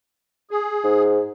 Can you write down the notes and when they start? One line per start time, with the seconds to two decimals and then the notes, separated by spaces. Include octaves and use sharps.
0.51 G#4
0.84 G#2